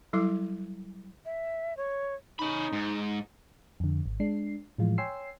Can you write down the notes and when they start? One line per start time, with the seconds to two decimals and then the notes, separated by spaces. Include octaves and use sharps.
0.13 F#3 G3 E4 A4 D6
1.25 E5
1.77 C#5
2.39 C#4 D#4 B5
2.73 G#2
3.80 F2 D3
4.06 G#1
4.20 G#3 D4 C7
4.78 A2 E3 F3 G#3 F4
4.98 C#5 G5 G#5 C6 E6 C7